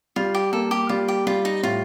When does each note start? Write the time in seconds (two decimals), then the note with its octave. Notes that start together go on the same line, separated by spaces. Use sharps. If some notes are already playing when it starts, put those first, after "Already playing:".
0.16 G3 F4
0.35 G4
0.53 A#3 A4
0.71 G4
0.89 G3 F4
1.08 G4
1.27 G3 F4
1.45 D#4
1.63 A2 F4